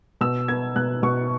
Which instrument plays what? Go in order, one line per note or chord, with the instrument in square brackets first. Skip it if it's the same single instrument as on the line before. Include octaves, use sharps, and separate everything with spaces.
[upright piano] B2 E6
B3 G#6
B2 F#6
B2 C#6